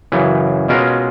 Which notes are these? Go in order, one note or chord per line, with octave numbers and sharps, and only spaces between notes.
F#2 C#3 E3
B2 G#3 C#4 F4 A#4